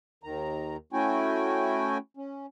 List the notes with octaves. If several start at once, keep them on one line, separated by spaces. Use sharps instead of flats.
D#2 D#3 A#5
A3 C#4 E4 F#4 G5 G#5
C#4